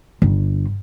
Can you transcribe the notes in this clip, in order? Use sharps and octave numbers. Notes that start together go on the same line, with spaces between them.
G1